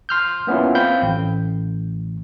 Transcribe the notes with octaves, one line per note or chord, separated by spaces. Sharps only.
C6 F6 G6
A#3 B3 C#4 E4 F4
C4 F5 G5 B5 G6
A1